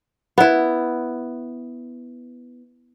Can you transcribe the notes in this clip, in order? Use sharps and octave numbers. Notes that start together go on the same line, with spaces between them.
B3 E4